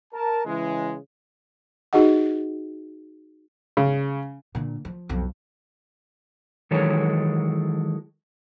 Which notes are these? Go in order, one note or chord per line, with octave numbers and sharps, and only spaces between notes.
A#4 A5
C#3 E3 G#3
D#4 F#4 G#4 D#5 F#5
C#3
A#2 D3
F3
B1 F2
D#3 E3 F#3 G#3 A4 C#5